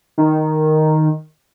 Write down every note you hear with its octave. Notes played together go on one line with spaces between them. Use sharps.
D#3